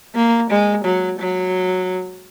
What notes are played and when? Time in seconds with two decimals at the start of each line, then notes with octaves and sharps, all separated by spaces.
0.15 A#3
0.50 G#3
0.85 F#3
1.19 F#3